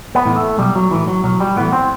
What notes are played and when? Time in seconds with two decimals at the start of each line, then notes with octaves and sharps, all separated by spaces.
0.15 B3
0.26 A2 E3
0.36 A3
0.58 B1 G3
0.75 F#3
0.91 A2 E3
1.08 F#3
1.24 B1 F#3
1.40 G3
1.56 A2 E3 B3
1.73 C4